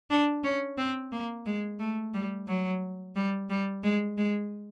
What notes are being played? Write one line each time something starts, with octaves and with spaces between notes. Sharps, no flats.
D4
C#4
C4
A#3
G#3
A3
G3
F#3
G3
G3
G#3
G#3